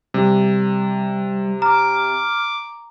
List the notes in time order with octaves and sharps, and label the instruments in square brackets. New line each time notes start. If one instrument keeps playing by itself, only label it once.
[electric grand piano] C3 [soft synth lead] G3
[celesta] A#5 [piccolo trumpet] D6 [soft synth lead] F6